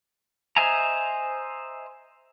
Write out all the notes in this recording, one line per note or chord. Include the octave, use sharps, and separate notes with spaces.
C5 D#5 E5 G#5 A#5